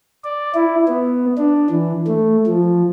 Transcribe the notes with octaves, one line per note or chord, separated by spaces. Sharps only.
D5
E4
B3
D4
E3
A3
F3